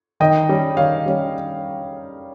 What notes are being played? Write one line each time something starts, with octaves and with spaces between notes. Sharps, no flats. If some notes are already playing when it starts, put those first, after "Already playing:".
D#3 D#5 G5
G3 C#4
D#3 C#5 F5
G3 C#4